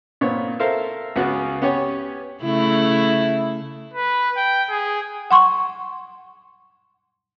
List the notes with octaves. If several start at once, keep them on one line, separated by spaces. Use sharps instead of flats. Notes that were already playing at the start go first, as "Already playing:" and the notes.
A#2 B3 C4 C#5
A4 A#4 C5 E5 F5
C#2 C#3 B3 F#4 F#6
B3 C#4 G4 C#5 G#5
C#3 A3 E4
B4
G5
G#4
F#5 C6 C#6